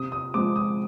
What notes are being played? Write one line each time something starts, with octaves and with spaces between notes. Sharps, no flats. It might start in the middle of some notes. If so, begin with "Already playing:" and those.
Already playing: C3 D#6
D#6
F3 G#3 C4 D6
D#6